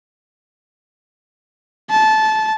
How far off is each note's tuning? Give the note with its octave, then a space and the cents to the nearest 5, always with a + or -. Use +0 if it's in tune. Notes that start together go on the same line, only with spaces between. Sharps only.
A5 -20